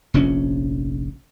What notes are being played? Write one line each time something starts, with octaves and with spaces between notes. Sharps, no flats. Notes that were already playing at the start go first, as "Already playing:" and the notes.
F1 A#1 F3 C#4